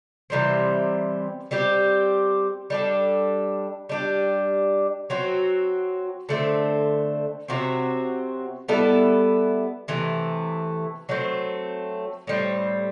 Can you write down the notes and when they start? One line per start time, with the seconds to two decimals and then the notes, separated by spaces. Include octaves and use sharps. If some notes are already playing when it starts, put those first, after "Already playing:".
0.30 C3 E3 G3 C4
1.51 G3 C4 G4
2.70 G3 D4 A4
3.89 G3 D4 G4
5.10 F#3 C4 F#4
6.29 D3 A3 C4
7.48 C3 F#3 C4 F#4
8.68 G3 B3 E4 A4
9.88 C3 E3 A3
11.09 F#3 A3 C4
12.27 A2 G3 C4